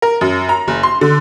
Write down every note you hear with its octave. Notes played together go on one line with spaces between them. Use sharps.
A#4
F#2
A#5
F#1
C6
D3